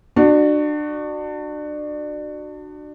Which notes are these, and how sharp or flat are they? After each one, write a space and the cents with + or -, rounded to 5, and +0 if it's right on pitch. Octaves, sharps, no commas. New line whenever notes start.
D4 +30 F#4 +0